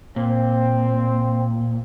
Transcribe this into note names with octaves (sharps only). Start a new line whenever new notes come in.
A#2 C4